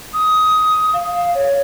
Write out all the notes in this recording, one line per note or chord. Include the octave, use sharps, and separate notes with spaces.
D#6
F5
C#5